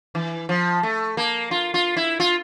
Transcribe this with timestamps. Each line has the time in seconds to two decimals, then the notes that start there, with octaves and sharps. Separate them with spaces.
0.15 E3
0.49 F3
0.83 A3
1.17 A#3
1.51 F4
1.74 F4
1.97 E4
2.20 F4